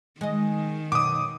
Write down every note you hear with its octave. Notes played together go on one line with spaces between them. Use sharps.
D#3 G#3 D#5
F#2 B2 D6 D#6